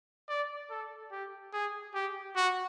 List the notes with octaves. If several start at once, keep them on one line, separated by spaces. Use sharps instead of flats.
D5
A4
G4
G#4
G4
F#4